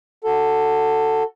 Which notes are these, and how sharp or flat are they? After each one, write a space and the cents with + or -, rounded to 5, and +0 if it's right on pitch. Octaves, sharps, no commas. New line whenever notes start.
F#4 +0 A4 +10